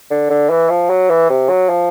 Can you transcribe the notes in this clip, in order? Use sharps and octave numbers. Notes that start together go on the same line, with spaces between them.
D3
D3
E3
F3
F#3
E3
C3
F#3
F3